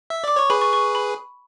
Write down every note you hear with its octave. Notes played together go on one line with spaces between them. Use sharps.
E5
D5 D6
C#5 C#6
G#4 B4 B5
C#6
C#6
B5